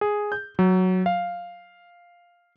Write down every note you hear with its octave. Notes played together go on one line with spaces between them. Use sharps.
G#4
G6
F#3
F5